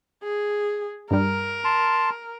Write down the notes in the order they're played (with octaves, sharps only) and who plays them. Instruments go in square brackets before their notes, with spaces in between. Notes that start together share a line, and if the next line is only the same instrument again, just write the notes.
[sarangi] G#4
[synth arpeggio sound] G2 G3 [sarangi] A#4
[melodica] A5 C6